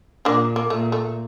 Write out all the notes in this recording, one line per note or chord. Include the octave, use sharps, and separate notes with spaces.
A#2 A#3 D4
A#3
A#2 A3
A3